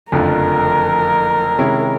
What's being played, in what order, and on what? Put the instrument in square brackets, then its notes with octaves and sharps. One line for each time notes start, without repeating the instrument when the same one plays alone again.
[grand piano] F#1 F2 D3 F3 A3 [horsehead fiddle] A#4
[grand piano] C3 D#3 G#3 C#4 E4